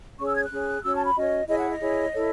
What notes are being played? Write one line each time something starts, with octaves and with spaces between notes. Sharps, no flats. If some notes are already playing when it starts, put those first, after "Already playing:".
C#4 G#4 C#5 C#6
E6
G#6
F#6
C#4 G#4 C#5
C#4 F#4 C#5 E6
A5
B5
C#4 F#4 C#5 D#5
E4 G#4 C#5 D#5
F#5
D#5
E4 G#4 C#5
E4 A4 C#5